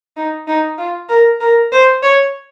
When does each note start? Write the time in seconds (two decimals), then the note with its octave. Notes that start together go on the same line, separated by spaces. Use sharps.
0.17 D#4
0.47 D#4
0.78 F4
1.09 A#4
1.40 A#4
1.72 C5
2.03 C#5